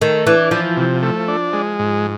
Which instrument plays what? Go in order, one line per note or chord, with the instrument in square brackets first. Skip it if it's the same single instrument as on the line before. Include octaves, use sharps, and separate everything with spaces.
[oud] D#3 [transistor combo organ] A3
[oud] E3 [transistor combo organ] D4
[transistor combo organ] E3 [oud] F3
[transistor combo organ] C3
A3
D4
G#3
G#2